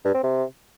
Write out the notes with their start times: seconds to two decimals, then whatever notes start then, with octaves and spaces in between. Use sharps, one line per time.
0.05 G2
0.14 C4
0.24 C3